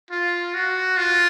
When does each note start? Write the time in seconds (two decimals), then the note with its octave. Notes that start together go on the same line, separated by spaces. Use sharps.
0.11 F4
0.54 F#4
0.97 F4